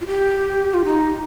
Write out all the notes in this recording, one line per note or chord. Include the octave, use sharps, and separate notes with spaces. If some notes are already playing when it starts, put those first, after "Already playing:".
F4
G4
F4
D#4